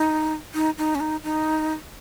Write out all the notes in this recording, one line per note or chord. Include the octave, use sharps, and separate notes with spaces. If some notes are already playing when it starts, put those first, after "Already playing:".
Already playing: D#4
D#4
D#4
C#4
D#4
D#4